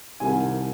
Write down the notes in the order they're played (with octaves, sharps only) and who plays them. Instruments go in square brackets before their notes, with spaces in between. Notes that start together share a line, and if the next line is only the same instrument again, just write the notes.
[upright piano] C2 C3 D#3 G#5